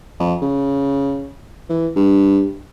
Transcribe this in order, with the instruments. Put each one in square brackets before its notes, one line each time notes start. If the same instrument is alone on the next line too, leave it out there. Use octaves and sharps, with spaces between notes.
[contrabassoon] F2
C#3
E3
G2